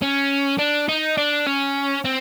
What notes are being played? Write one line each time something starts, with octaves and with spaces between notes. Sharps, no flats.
C#4
D4
D#4
D4
C#4
C4